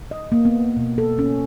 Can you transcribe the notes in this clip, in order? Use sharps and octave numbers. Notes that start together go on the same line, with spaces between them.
D#5
A#3
B3
B2
A4
C#4